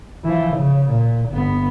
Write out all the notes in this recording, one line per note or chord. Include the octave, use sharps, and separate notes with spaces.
E3 F3
C#3
A#2
G1 B3